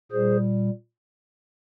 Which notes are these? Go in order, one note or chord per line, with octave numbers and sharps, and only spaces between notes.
A#2 G3 G#4 C5